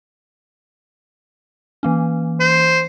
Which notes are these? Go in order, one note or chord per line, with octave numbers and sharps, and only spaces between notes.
E3 A#3 C#4
C5